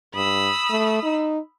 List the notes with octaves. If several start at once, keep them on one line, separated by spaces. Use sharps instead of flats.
G2 B5 D#6 E6
A3
D#4